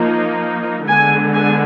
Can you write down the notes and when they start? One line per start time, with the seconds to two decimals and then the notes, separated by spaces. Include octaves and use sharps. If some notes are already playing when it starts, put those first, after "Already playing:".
Already playing: F3 A#3 D#4
0.88 D3 G#3 B3 G#5
1.34 G#5